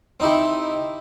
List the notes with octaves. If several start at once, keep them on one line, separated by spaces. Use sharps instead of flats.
C4 D#4 E4 G4